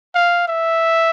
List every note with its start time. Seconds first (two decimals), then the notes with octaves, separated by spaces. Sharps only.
0.15 F5
0.48 E5